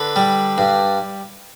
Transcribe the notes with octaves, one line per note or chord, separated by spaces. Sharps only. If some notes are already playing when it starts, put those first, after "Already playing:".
Already playing: D3 B4
G3
G2